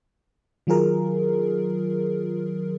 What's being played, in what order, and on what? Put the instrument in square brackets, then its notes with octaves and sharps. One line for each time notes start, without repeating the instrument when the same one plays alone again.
[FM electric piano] D#3 F#3 F4 G#4 A#4